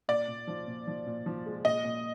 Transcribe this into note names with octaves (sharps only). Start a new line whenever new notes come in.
A#2 D5
A#2
F3
A#2
F3
A#2
F3
G#3
A#2 D#5
A#2